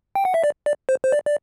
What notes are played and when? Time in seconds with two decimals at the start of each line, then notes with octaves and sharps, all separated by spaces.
0.15 G5
0.25 F#5
0.34 E5
0.44 D5
0.66 D5
0.89 C5
1.04 C5
1.12 D5
1.26 D5